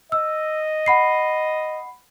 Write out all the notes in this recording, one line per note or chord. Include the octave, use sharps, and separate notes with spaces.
D#5 E6
F#5 B5 C7